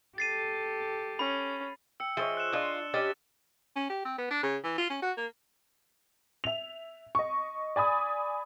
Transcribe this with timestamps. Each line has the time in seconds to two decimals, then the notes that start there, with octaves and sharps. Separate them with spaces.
0.18 G4 A4 A6 C7 D#7
1.19 C#4 B5
2.00 G5 E6 C#7
2.17 F3 G#4 C#5 D#5 E5 G7
2.37 F#6 E7
2.53 D4 F4 D#5 A5 C6
2.94 C#4 G4 D#5 A6
3.76 C#4
3.90 G4
4.05 C4
4.18 B3
4.31 D4
4.43 C#3
4.64 E3
4.78 F4
4.90 C#4
5.02 F#4
5.17 A#3
6.44 E5 F7
7.15 D#5 C#6
7.76 D5 G#5 B5 D#6